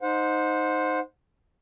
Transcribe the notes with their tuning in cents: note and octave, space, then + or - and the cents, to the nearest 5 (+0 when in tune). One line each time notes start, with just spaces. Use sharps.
D#4 +0 C5 +0 F#5 -30